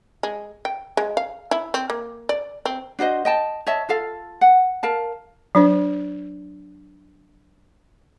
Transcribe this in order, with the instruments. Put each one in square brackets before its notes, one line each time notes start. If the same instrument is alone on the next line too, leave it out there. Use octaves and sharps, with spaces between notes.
[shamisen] G#3
G5
G#3
F5
E4
C4
A#3
D5
C4
[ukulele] D4 F#4 C5 D#5
D#5 G5 A5
C#5 D#5 E5 A5
F4 A4 F5
F#5
A#4 F5 A5
[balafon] F#3 D4 C5